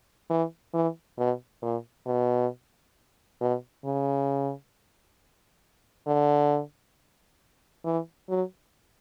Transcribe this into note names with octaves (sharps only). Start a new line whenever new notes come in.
E3
E3
B2
A#2
B2
B2
C#3
D3
E3
F#3